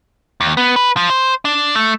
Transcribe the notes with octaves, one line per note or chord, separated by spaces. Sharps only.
D#2
B3
B4
F3
C5
D4
A3